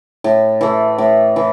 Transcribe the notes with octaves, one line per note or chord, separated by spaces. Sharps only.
A2
E3 A3
A2
E3